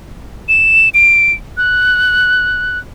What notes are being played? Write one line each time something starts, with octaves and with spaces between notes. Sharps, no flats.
E7
D7
F#6